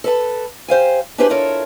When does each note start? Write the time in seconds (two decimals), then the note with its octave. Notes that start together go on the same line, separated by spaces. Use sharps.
0.04 A4 B4 A5
0.68 G4 C5 F5 G#5
1.18 D4 E4 G4 G#4 B4 C5
1.29 D4 E4 F4 A4 A#4 C#5